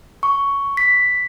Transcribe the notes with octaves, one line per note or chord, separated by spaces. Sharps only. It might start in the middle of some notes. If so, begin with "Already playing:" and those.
C#6
B6